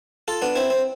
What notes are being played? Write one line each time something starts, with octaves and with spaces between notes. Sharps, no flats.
F4 A4
B3 D4
C4 E4
C4